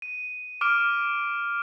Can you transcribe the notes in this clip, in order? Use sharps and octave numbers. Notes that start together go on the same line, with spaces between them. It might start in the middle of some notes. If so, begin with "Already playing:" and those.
D#7
D6 F6 D7